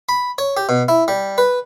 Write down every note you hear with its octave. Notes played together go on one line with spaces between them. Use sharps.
B5
C#5
G4
B2
E4
G3
B4